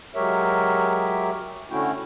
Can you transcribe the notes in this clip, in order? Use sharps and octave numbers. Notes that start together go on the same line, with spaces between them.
F#3 G#3 G4 A#4 C#5 E5
D3 A3 C#4 E4 F#4 G5